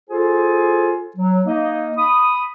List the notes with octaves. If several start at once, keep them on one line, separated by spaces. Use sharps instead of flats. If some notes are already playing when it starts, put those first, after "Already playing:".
F4 G#4 A4 C5 G#5
F#3
A#3 D#4 D#5
B5 D#6